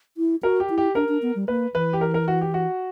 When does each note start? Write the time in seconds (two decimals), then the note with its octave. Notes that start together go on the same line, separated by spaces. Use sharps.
0.17 E4
0.43 F#4 A#4
0.60 G4
0.70 E4
0.78 G4
0.95 D4 A#4
1.09 D4
1.22 B3
1.35 G3
1.48 A#3 B4
1.75 E3 B4
1.93 G4
2.01 A#4
2.14 A#4
2.28 F#4
2.41 G4
2.54 F#4